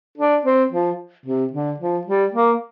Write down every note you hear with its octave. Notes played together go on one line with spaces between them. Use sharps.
D4
C4
F3
C3
D3
F3
G3
A#3